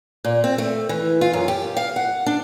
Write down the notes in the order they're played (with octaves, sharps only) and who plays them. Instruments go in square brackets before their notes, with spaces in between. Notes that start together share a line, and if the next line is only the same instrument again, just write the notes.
[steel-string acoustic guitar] A#2
C4
A3
E3
F4
F#2
G4
F5
F#5
D4